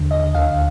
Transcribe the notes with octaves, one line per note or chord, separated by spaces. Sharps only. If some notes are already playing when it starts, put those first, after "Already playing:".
Already playing: D#2 D3
D#5
D2 D3 F5